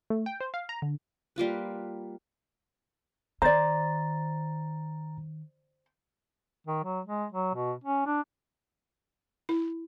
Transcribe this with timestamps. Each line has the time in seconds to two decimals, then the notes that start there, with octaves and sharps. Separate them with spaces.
0.10 A3
0.26 G5
0.41 C5
0.54 F5
0.69 A#5
0.82 D3
1.36 G3 A#3 F4 B4
3.42 D#3 C5 D5 A#5 A6
6.66 D#3
6.84 F#3
7.05 G#3
7.32 F#3
7.54 B2
7.84 C#4
8.06 D4
9.49 E4